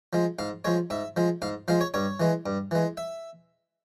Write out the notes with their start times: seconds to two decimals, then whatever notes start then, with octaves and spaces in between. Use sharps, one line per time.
0.13 F3 G#3
0.39 G#2 F5
0.65 F3 G#3 C#5
0.90 G#2 E5
1.17 F3 G#3
1.42 G#2 F5
1.68 F3 G#3 F5
1.81 C#5
1.94 G2 C#5
2.20 E3 G#3
2.46 G2
2.71 E3 G#3
2.97 E5